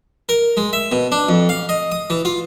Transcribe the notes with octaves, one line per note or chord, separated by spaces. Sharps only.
A#4
G#3
E5
B2
D4
F2
F5
D#5
D#6
E3
F4